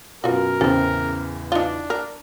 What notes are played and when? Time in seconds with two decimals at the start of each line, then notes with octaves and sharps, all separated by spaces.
0.24 F#2 B2 F4 F#4 A#4
0.61 A1 E2 C#3 C4 A4
1.52 D4 D#4 F4
1.90 A#4